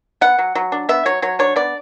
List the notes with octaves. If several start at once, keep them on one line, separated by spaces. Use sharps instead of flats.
B3 F#5
F#3
F#3
D4
B3 E5
F#3 C#5
F#3 C#5
D4 C#5
B3 D5